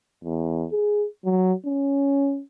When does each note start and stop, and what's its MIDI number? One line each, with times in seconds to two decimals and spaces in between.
0.24 0.66 40
0.72 1.06 68
1.25 1.53 54
1.66 2.41 61